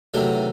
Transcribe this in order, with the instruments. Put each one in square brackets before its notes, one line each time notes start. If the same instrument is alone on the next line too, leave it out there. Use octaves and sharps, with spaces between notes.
[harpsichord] E2 C3 D#3 F#3 A3